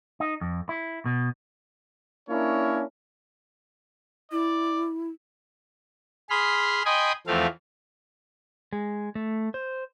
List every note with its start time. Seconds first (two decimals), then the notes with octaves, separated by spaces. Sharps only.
0.20 D#4
0.41 F2
0.69 E4
1.05 B2
2.29 A#3 C#4 D4 E4 A#4 C#5
4.32 E4 D5
6.30 G#4 B5 C6 F6
6.85 D#5 G5 G#5 B5 C6 D#6
7.27 E2 F3 A3 C4 F5
8.72 G#3
9.15 A3
9.54 C5